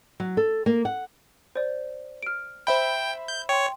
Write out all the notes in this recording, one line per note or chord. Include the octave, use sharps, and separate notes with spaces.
F#3
A4
A#3
F#5
C5 D5
F6 D7
C5 E5 G5 B5
G6
C#5 G5 C6